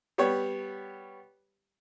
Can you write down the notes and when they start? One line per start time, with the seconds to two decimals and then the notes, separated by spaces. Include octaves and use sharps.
0.18 G3 B3 G4 C#5